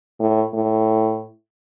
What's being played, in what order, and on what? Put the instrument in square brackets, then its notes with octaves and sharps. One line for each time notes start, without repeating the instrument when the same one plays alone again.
[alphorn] A2
A2